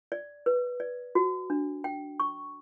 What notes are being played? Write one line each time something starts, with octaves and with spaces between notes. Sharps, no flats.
D5
B4
D5
F#4
D4
G5
C#6